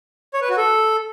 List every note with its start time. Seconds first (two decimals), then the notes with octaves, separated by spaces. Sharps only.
0.33 C#5
0.41 B4
0.49 F#4
0.57 A4